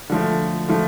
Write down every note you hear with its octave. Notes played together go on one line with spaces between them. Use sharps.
D3 F3 A3
D3 F3 A3